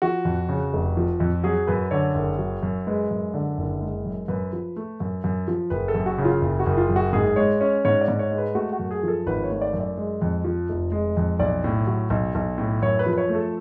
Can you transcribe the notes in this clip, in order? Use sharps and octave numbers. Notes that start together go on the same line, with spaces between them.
F3 F#4
F2
C#3
F1
F3
F2
F#3 G#4
F#2 B4
D3 C#5
F#1
F#3
F#2
G#3 B4
F#2
D3
F#1
G#3
F#2
F#2 B4
F3
A3
F#2
F#2
F3
F#1 B4
A4
F#2
F#4
C#3
F4
F#1
F#4
F#1
F4
F#2
F#4
G#2 G#4
G#3 C#5
C#4 C#5
G#2 C#5
D5
G#2
C#5
G#3
B4
A3 F#4
F#4
F#2
G#4
F3 A4
G#1 B4
C#5
A3
D5
F#2
D5
G#3
F2
F3
F1
G#3
F2
B1 D5
A2
F#3
B1
B1
A2
F#2 C#5
B4
F3
B4
C#5
A3
A4